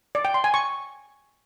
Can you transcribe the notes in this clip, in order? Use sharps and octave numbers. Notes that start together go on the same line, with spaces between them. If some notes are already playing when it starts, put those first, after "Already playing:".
D5
G5
C6
G#5
C#6